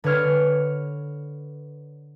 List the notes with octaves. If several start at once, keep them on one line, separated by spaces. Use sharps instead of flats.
D3 B4 C#5 F6